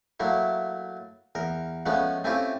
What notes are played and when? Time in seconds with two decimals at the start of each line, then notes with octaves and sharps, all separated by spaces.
0.20 F#3 A3 A#3 E4
1.35 E2 A#4
1.86 F3 G#3 A3 B3 C#4
2.24 A3 C4 C#4 E4 F4 G4